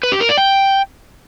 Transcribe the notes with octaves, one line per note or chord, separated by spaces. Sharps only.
B4
G4
A#4
D5
G5